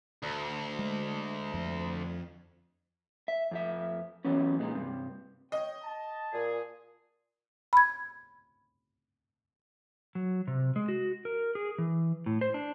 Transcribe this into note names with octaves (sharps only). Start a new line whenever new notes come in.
D2
G#3
F2
E5
F2 F3 E5
E3 F#3 B3 C#4
A#2 G#3 D#4
G2 C3
C#5 D#5 G5
A5
A#2 G#4
B5 G#6
F#3
C3
G#3
F#4
A#4
G#4
E3
A2
C5
D4